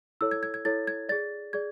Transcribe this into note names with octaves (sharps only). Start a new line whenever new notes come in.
E4 A4 C#5 E6
G#6
G#6
G#6
E4 A4 C#5 A6
G#6
G#4 D5 A6
G#4 D5 G#6